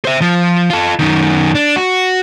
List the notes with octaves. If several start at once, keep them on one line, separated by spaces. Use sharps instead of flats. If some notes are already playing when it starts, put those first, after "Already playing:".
C5 E5
F3
F4 A4
F#2 D#3
D4
F#4